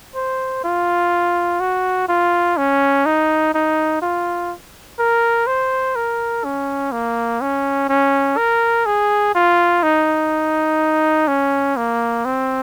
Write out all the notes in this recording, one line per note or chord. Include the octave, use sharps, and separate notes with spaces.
C5
F4
F#4
F4
C#4
D#4
D#4
F4
A#4
C5
A#4
C#4
A#3
C#4
C#4
A#4
G#4
F4
D#4
C#4
A#3
C4